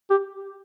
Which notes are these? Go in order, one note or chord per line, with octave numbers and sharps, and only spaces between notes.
G4